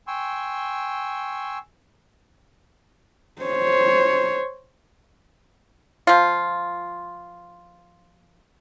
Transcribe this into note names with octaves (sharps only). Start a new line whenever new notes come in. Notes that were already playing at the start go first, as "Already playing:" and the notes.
G5 G#5 C6 C#6 E6
C5 C#5
F3 F4